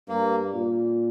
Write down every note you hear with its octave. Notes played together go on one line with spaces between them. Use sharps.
G2 A#3
A#2